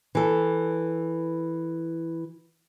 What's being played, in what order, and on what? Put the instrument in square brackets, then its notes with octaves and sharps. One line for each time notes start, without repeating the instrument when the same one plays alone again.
[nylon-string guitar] E3 A4